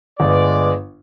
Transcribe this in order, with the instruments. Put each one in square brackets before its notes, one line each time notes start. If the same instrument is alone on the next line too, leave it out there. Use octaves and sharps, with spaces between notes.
[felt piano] G1 [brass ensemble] G#3 B4 D5